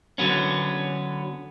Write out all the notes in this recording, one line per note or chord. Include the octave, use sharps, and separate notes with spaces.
D3 F#3 B3 C#4